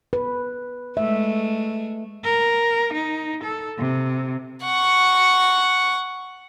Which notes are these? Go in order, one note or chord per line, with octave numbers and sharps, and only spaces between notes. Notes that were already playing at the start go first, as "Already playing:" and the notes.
B4
G#3 A3 E5
A#4
D#4
A4
C3
F#5 C#6